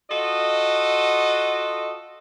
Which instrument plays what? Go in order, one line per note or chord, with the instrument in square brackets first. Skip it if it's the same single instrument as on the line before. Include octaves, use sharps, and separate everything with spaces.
[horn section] F4 F#4 A4 D#5